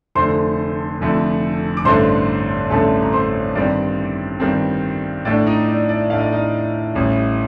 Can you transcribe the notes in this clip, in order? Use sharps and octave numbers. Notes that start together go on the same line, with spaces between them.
F1 F2 D3 A3 C5 C6
F1 F2 D3 A3
D6
A1 G2 D3 A3 D4 C5 C6
A1 G2 D3 A3 D4 A4 A5
A#5
C5 C6
G2 D#3 G3 C4 D5
G2 D#3 G3 C4
A2 A3 D4 D5
D#4 D#5
D5
D5
A2 A3 D4 F5
D#5
D5
D#4 D#5
A1 A2 G3